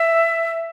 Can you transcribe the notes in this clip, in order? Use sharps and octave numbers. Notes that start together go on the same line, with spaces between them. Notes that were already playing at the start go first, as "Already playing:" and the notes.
Already playing: E5